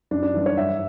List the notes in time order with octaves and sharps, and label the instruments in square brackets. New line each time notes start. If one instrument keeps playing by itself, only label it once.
[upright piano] F#2 D4
D4
E3 G3
C#5
G2 E5